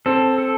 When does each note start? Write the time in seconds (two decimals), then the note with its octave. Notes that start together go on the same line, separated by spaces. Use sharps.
0.06 C4 A4
0.38 A4